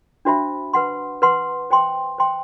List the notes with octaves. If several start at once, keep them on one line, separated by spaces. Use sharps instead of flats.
D4 F#4 C5 E5 B5
B4 F#5 C6
B4 F#5 C6
C5 G5 C6
C5 G5 C6